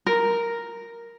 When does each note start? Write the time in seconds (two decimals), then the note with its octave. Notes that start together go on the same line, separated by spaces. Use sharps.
0.06 A#4